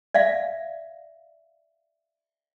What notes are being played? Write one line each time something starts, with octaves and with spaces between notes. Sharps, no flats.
D5 E5 F5